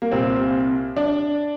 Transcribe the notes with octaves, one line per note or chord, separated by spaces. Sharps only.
A#3
C2 A#2 C4
D4